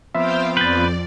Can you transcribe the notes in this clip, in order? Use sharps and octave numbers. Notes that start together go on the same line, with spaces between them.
F3 B3 C4 C5 E5 F5 G5
F2 B4 D5 G6 A6